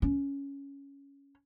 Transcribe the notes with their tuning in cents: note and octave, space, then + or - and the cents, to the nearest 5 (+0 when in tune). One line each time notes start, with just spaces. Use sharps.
C#4 +10